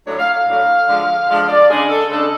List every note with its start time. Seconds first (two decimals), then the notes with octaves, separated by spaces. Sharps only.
0.05 A2 F#3 A3 D4 C#5
0.19 F5
0.33 F5
0.47 A2 F#3 A3 D4
0.88 D3 F3 G#3 D4
1.28 D3 F3 G#3 D4 F5
1.49 D5
1.69 C#3 G#3 D4 G#4
1.90 A4
2.10 C#3 G#3 D4 A4